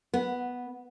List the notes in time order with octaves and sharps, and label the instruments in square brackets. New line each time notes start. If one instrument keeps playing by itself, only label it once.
[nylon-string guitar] B3